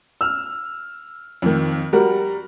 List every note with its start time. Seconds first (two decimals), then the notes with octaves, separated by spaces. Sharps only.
0.21 E6 F6
1.42 F2 D#3
1.93 G3 F#4 A#4